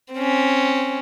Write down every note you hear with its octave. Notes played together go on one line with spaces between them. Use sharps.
C4 C#4